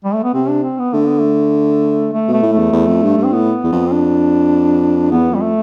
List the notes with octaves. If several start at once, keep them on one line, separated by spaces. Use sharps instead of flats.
G3
A3
B3
C3 C4
D4
C4
B3
D3 A3
B3
A3
A3
B2 A3
A2
A3
E2
E2
F2
G2
G2
C4
A2 B3
E2
F2
C4
D4
E2 B3
F2 G3
A3